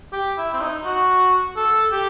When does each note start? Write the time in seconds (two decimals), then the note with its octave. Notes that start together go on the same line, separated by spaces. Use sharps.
0.13 G4
0.38 E4
0.54 C4
0.61 D#4
0.85 F#4
1.56 A4
1.92 G4